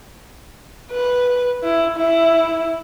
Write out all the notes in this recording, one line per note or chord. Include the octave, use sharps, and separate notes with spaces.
B4
E4
E4